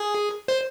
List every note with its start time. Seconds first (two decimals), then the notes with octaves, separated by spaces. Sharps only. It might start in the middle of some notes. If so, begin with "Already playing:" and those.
Already playing: G#4
0.48 C5